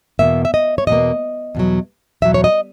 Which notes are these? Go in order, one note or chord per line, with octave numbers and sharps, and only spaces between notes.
E2 B2 A#3 E5
E5
D#5
C#5
E2 B2 A#3 D#5
E2 B2 F#3
E2 B2 F#3 E5
C#5
D#5